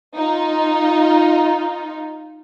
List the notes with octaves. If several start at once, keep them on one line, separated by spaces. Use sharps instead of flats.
D#4 F4